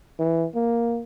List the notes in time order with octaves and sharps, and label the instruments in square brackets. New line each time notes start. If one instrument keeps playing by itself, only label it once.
[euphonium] E3
A#3